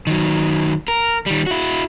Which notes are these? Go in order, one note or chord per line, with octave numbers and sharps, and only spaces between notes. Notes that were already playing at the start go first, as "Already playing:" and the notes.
D#3 F#3
A#4
D#3 G3
E4 F#4